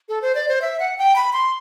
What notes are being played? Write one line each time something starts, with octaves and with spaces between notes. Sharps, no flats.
A4
C5
D5
C5
E5
F#5
G5
B5
C6